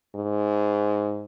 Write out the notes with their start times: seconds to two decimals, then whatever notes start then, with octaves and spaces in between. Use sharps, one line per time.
0.16 G#2